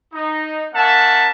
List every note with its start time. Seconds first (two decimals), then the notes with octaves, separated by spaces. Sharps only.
0.13 D#4
0.73 A#3 C#4 A#4 E5 F#5 A5